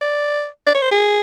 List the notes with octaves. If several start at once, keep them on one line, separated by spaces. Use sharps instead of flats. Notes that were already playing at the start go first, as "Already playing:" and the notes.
D5
D5
C#5
C5
G#4